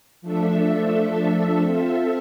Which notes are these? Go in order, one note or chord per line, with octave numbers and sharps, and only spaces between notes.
F3 A3 D4 A4 E5
C4 F4 A4 E5